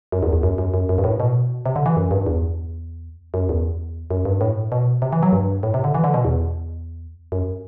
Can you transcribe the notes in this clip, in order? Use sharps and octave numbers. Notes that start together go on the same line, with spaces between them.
F#2
E2
E2
F#2
F#2
F#2
F#2
G2
A2
B2
C3
D3
E3
F#2
G2
E2
F#2
E2
F#2
G2
A2
B2
C3
E3
F#3
G2
A2
C3
D3
E3
D3
B2
E2
F#2